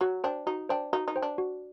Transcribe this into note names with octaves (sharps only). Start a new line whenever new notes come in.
F#3 F#4
D4 C5 G5
D#4 F#4
D4 C5 G5
D#4 F#4
D#4
C5 G5
D4
F#4